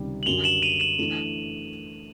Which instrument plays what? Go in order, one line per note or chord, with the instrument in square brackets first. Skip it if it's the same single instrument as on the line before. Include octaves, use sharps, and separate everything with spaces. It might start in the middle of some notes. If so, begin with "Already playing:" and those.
Already playing: [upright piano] C#2 C3 D#3 G3
[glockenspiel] F#7
[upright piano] F#2 D3 G3 [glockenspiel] F7 G7
[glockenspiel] E7 F#7
D#7 F7
E7 F#7
[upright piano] E3 A3 D4